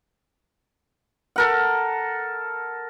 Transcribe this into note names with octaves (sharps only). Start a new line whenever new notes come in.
A4 A#4 F#5